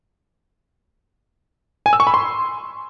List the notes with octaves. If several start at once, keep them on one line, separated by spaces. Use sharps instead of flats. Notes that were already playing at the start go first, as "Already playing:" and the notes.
G#5
E6
C#6
B5
C6